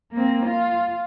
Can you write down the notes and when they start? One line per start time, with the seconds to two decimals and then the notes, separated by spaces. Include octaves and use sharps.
0.12 A#3 C4
0.46 F4